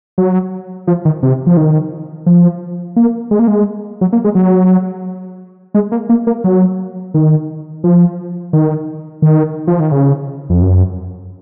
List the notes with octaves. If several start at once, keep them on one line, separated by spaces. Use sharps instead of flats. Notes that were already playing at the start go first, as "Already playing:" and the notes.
F#3
F3
D#3
C3
F3
D#3
F3
A#3
G#3
A#3
G#3
F#3
A#3
G#3
F#3
G#3
A#3
A#3
A#3
F#3
D#3
F3
D#3
D#3
F3
D#3
C#3
F2
F#2